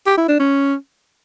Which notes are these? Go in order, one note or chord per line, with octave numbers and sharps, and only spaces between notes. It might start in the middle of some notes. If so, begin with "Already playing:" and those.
G4
E4
D4
C#4